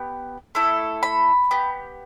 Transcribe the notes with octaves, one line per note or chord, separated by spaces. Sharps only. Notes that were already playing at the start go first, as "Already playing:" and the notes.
Already playing: B3 G4
A3 E4 A4
B5
B3 G4